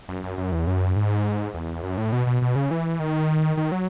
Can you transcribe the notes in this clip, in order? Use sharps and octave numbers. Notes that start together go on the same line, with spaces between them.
F#2
F#2
F#2
E2
F#2
G#2
E2
F#2
A2
B2
B2
B2
C#3
E3
D#3
D#3
F#3